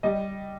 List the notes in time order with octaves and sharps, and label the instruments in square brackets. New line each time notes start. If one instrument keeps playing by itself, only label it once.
[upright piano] G3 D#5